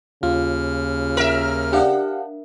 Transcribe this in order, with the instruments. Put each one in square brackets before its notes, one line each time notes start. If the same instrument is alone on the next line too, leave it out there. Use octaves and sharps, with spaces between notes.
[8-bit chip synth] D#2 F6 [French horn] C#3 [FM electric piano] F4
[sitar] A#4 E5
[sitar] D4 [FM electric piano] G4 F5 F#5